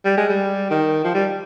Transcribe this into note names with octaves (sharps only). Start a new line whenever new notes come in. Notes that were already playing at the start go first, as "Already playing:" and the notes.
G3
G#3
G3
D#3
F3
G3